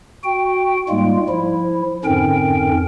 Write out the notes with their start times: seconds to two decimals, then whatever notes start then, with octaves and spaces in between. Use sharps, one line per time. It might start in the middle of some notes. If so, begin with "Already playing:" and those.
0.24 F#4 G5
0.89 G#2 G3 G#3 A#3 F4
1.29 F3 E4
2.05 F2 G#2 D3 C#4 A#4 G5